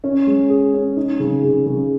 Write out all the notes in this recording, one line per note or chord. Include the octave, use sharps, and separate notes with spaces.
C#4
G#3
G#4
C#4
D#4
C#3
C#3
C#3